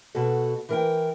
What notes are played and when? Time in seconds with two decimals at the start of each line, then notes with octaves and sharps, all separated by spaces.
0.15 B2 F#4 A4
0.69 E3 A#4 G5